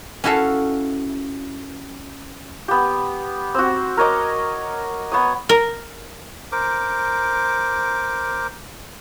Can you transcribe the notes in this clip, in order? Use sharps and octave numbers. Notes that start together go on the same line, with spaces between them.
C#4 E4 F#4 A4 F5
B3 G4
C4 F#4
A#4 C#5 D#5 D6
B3 C#5 D#6
A#4
A#4 C5 D6